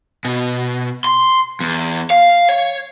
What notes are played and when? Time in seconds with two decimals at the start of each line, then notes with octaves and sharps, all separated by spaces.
0.25 B2
1.04 C6
1.60 E2
2.10 F5
2.49 C#5